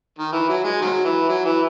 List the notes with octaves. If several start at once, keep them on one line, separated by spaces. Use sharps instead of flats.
D#3
E3
F#3
G#3
D#3 F#3
E3
F#3
E3